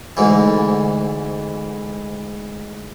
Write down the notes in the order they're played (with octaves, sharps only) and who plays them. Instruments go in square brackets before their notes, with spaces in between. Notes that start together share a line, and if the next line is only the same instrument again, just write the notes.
[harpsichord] D2 G#2 E3